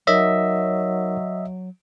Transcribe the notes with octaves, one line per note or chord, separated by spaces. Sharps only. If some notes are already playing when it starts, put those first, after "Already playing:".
F#3 D#4 A#4 C#5 D#5 E5